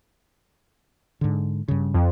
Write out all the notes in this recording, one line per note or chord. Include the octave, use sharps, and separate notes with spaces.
G#2 D3
G2 C#3
F2